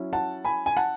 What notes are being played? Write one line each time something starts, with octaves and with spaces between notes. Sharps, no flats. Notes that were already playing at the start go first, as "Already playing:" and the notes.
Already playing: F#3 C#4 E4
F#5 A5
G#5 B5
G#5
F#5 A5